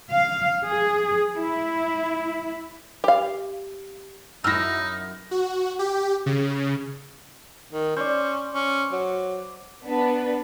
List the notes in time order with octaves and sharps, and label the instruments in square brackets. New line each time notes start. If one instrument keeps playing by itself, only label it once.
[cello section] F5
G#4
E4
[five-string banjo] G4 F5
[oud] F#2 E4 [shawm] D#4 [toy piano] E6 [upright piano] F6 A#6
[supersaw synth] F#4
G4
C#3
[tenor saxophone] D#3
[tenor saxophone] C#4 [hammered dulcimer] C5 D5
[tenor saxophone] C#4
F#3
[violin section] B3 D4 B4